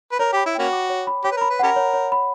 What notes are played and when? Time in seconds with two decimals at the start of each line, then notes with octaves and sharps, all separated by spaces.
0.12 B4
0.19 A#4 C#5
0.33 G4 B5
0.46 E4
0.55 A#3 C#4 F#4 G5
0.73 D6
0.90 C#5
1.07 B5
1.24 G4 C#5
1.32 B4
1.37 A#4
1.41 B5
1.50 B4
1.59 C#4 G4 A#4 F#5
1.76 C#5
1.94 C#5
2.12 B5